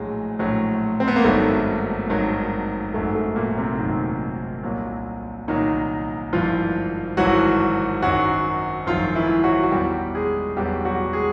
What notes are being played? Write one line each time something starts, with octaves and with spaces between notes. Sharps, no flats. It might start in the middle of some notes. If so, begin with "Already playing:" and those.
Already playing: A#1 A2 F#3 G#3
A#1 A2 F#3
C4
B3
A#3
G#1 G2 D#3 F#3 A3
G#1 G2 D#3 F#3
G#1 F#2 D#3 A3
A3
A#2 A#3
C3 C4
G#1 F#2 D#3
C2 A#2 F#3
C2 A#2 D#3 F#3 D#4
G#1 G2 E3 F3 F4
G#1 G2 E3 F#3 F#4
G#1 F#2 D#3 F#3 F#4
G#1 F#2 D#3 F3 F4
E3 E4
F#3 F#4
F#4
E2 B2 F#3 G3 G4
G#3 G#4
E2 B2 F#3 G3 G4
F#3 F#4
G#3 G#4